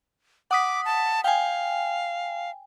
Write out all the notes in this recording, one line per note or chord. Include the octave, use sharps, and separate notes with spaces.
F#5 D6 D#6 B6
A5
F5 G5 G#5